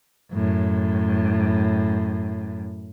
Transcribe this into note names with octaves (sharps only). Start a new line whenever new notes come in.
F#2 A2